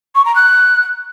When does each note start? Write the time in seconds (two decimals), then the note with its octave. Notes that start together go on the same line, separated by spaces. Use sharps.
0.15 C#6
0.25 A#5
0.35 F#6